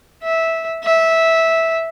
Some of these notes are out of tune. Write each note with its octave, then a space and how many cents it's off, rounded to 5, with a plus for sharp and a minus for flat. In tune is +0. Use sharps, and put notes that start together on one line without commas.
E5 -10
E5 -10